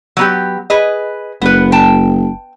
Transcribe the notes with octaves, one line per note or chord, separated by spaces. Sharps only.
F#3 B3 G4
G#4 B4 D#5
F#1 B3 B4
G5 A5